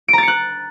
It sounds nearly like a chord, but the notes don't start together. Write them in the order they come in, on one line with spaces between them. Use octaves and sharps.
D7 A#5 A6 C#7 F#6